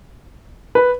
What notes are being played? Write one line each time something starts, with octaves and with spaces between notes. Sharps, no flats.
B4